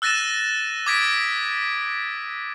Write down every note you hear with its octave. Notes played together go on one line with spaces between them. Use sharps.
E6 F#6 A6 A#6 D#7 E7
D6 D#6 G#6 A#6 B6 D7